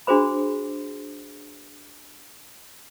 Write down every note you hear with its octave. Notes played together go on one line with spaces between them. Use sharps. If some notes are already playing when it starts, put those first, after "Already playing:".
D4 F#4 G#4 C5 B5